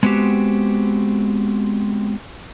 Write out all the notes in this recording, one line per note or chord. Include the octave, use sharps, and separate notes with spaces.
G#3 B3 C4 F#4 G4